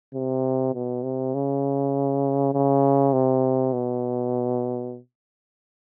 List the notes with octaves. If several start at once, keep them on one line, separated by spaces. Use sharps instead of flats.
C3
B2
C3
C#3
C#3
C3
B2